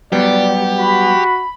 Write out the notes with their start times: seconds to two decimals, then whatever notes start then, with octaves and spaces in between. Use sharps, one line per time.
0.12 F#3 G3 B3 G4 D5
0.79 F#4 B5